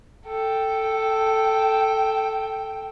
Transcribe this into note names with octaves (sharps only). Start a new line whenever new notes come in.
A4 G5